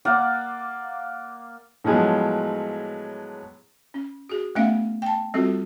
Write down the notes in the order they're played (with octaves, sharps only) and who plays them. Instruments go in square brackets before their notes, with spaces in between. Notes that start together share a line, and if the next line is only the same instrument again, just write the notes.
[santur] A#3 D5 F5 F#5
[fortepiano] A2 F3 F#3 G#3 B3
[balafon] C#4
F#4 G#4
A3 B3 C#4 E5 F5
G5 A5
G3 C4 F4 F#4 A4